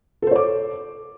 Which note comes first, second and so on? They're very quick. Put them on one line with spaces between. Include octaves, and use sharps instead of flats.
A4 C5 C#5 D6